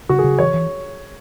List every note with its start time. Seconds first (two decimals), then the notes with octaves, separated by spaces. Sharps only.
0.09 C#3 F#4
0.19 G#4
0.24 C#3
0.39 E3 C#5
0.54 E3